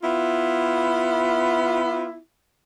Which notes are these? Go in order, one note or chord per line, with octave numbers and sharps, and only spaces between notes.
B3 E4 F4